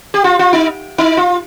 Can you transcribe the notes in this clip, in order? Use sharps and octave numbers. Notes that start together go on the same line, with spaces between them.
G4
F4
F4
D#4
D#4
F4